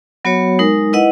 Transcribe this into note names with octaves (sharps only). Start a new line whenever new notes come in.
F#3 B3 F#4 C#5
G#3 D#4 A#4
E4 B4 D#5 F#5